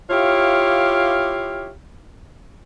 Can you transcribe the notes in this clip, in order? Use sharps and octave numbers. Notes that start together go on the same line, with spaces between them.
E4 F4 G4 C#5 F5